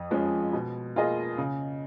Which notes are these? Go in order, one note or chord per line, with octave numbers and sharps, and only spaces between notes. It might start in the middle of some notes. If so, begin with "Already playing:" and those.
Already playing: F2
F3 G#3 C#4
B2
A#3 F4 G#4 D#5
C#3